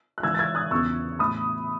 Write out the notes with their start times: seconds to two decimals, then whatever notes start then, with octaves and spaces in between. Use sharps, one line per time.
0.18 F#6
0.22 G#2 E3 E6 G#6
0.34 A6
0.39 E6 G#6
0.55 D#6 F#6
0.71 E2 C#3 E3 C#6 E6
1.19 A2 E3 B5 D#6